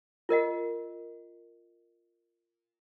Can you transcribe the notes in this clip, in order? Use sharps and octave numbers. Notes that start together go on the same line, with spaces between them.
F4 A#4 D#5 F#5